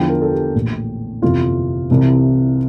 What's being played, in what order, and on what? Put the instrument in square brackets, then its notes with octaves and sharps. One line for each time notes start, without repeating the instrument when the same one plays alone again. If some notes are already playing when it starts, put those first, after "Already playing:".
Already playing: [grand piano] E2 D3 F3 G5
A#4
A4
G4
A#1 A2 E3
G1 F2 C3 E3 F4
C2 C3 E3